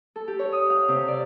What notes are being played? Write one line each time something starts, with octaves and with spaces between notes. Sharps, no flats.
A4
G4
C#5
D#6
F5
C3
D5